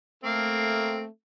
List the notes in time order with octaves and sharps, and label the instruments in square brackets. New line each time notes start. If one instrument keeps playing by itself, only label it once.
[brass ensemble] A3 [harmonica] A#3 C4